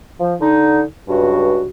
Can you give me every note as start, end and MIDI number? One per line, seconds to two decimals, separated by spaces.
0.20 0.34 53
0.40 0.83 50
0.40 0.83 63
1.08 1.69 37
1.08 1.69 43
1.08 1.69 66